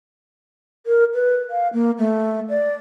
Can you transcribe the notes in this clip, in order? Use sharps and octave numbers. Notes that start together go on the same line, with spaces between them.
A#4
B4
F5
A#3
A3
D5